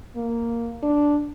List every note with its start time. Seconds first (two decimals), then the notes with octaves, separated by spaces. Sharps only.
0.16 A#3
0.83 D4